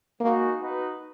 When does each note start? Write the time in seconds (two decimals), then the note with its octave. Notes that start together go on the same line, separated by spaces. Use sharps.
0.20 G#3 A#3 D#4 F#4
0.58 B3 D#4 F#4 B4